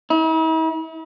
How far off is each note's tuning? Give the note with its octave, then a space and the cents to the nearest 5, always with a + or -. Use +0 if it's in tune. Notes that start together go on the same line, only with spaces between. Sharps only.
E4 -45